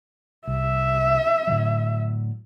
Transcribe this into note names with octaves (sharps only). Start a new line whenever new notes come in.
C2 E5
A2 D3 F#3